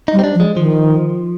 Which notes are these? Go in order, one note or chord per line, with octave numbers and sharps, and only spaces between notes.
G3 D#4
C4
D4
F3
G#3
D#3 F3